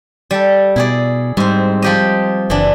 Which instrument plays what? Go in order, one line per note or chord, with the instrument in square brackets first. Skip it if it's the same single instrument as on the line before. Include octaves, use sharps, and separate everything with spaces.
[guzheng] G3 A4
[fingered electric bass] B2 [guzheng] E4 G#4 D5
[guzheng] G#2 C4 [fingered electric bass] G3
[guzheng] F3 G4 D#5
[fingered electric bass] F#1 [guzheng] E3 D4